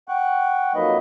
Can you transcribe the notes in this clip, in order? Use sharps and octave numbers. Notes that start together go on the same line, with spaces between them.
F#5 G5 C#6 F#6
F2 F#3 A#3 D#4 B4 D#5